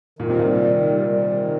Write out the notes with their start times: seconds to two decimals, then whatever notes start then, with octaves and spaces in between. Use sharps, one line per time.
0.19 A#2 D#3
0.30 C3
0.39 A#2 G3
0.64 D#3
0.86 G3
1.08 G3
1.30 D#3